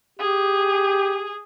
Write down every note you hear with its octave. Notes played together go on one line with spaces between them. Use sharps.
G4 G#4